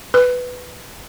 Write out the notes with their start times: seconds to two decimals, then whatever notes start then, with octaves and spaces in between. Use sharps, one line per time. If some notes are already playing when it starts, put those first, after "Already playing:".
0.14 B4